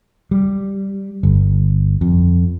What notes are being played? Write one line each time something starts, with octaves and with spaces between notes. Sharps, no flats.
G3
G1
F2